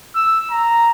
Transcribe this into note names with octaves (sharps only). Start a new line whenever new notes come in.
E6
A#5